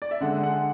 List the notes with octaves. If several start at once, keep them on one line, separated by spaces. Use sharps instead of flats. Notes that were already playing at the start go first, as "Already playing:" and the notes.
D5
E5
D3 G#3 D4 F#5
F#5